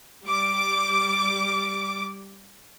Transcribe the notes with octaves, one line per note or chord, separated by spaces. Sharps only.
G3 D6